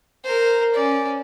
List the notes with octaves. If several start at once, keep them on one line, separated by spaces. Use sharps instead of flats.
A#4 C5
C#4 D5